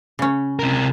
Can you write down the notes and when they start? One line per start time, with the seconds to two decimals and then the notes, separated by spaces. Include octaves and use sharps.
0.19 C#3 C#4
0.59 C3 A#4